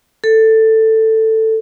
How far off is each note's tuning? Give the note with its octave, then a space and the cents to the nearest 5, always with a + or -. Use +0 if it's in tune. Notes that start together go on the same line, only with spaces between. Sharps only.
A4 +10